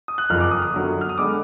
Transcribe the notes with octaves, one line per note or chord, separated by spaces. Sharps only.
D#6
F#6
F#1 F2 F3 F6
D6
D#6
D#6
F#2 D3 F#3 B3
F6
D#6
D3 G#3 B3 D6